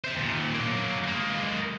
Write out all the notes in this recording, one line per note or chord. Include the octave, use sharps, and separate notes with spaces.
C5 E5
D#2 A#2
F#3 A#3
G#3 A#3